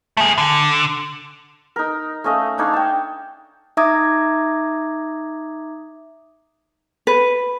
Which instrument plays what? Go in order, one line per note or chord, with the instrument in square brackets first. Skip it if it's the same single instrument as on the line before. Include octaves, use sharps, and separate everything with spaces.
[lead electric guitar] A3 G#4
D3
[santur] D#4 A#4
A3 C#4 D#5 F5
D4 D#4 C#5 F5
G5 A5
[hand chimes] D#4 E5 A#5 D6 D#6 G#6
[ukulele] B4